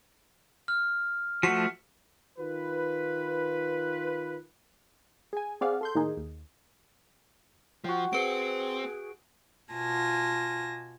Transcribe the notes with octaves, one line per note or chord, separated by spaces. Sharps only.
F6
F3 A3 F#4 B6 C#7
D#3 F4 B4
G#4 G#5
C4 G#4 D5 F5 F#5
A4 C6 G6
A2 D#3 A#3 D#4 G#4
D#2
F3 F#4 G5
C4 G#4 B4 D7
B2 F4 G#5 A5 A#6